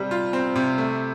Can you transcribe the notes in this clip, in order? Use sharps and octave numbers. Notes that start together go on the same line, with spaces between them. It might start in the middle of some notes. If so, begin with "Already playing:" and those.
Already playing: C3 G3 C4
F4
C4
C3
A3